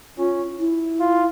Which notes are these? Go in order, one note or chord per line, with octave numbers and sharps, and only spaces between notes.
C#4 F4
E4
F4